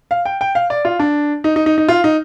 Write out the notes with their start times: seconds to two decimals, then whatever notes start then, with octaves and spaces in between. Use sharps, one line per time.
0.11 F5
0.25 G5
0.41 G5
0.55 F5
0.70 D5
0.85 F4
1.00 D4
1.44 D#4
1.56 D#4
1.66 D#4
1.78 D#4
1.88 F4
2.04 D#4